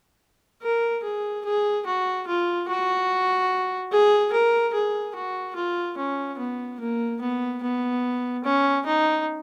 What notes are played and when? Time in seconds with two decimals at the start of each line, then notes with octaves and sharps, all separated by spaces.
0.62 A#4
1.04 G#4
1.45 G#4
1.86 F#4
2.27 F4
2.68 F#4
3.92 G#4
4.32 A#4
4.74 G#4
5.15 F#4
5.56 F4
5.97 C#4
6.38 B3
6.80 A#3
7.21 B3
7.63 B3
8.44 C#4
8.86 D#4